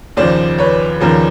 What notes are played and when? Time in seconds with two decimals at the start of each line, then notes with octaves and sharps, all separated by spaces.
0.17 D#2 C#3 F3 C5 D5
0.58 B4 C#5
1.01 D#2 C#3 F3 A#4 C5